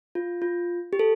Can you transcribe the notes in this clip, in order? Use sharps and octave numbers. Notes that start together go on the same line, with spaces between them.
F4
F4
G4
A4